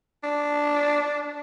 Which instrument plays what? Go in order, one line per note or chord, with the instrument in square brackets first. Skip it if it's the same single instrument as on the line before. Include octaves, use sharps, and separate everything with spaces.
[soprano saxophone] D4